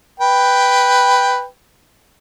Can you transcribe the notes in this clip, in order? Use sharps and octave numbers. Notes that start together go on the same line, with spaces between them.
B4 G5